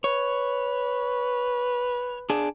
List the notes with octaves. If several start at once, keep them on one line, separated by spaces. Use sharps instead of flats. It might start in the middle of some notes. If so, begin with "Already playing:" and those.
B4 C#5
D4 G#4